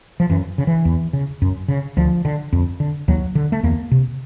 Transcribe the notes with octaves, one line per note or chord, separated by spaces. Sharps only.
F3
F#2 E3
C#3
E3
E2
C#3
F#2
C#3
D2 F3
D3
F2
D3
D#2 F#3
D3
A3
E2 A#3
C3